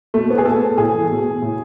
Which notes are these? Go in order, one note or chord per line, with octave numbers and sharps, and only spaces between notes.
B2 A3
B3
G#4
B2 A4
A2 G#4
E3
B2
A2